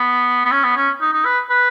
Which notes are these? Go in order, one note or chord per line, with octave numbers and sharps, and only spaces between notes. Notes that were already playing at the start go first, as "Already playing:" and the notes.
Already playing: B3
B3
C#4
B3
C#4
D#4
D#4
B4
B4